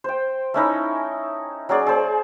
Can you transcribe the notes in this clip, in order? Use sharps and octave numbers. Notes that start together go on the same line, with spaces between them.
C5 G5
A3 C#4 D#4 E4
F#3 C#4 G#4 D5
G#4 C5